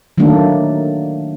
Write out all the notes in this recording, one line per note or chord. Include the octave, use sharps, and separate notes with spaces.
D#3 F#3 A3 A#3 D4